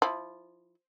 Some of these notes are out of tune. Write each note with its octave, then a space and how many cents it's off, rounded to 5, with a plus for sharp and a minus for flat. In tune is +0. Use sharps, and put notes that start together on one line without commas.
F3 +0 E4 -20